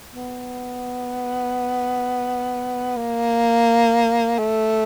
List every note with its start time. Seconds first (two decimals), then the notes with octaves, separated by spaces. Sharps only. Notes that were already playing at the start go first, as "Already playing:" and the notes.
0.14 B3
2.97 A#3
4.39 A3